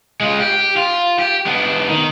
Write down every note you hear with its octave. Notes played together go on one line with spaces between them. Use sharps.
G#3 F4
G4
F4
G4
B3 D4
D#3